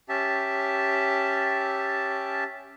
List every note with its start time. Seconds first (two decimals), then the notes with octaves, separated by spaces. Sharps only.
0.09 C#4 G4 E5 A5